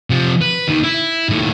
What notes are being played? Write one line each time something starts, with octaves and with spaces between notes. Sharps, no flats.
C3 F3
B4
D#2 D#3
E4
D#2 A2